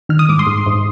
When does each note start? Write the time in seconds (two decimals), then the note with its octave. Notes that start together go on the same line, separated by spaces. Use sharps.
0.09 D#3 F6
0.19 D#6
0.29 G#2 D6
0.39 C6 D#6
0.47 G#2
0.66 G#2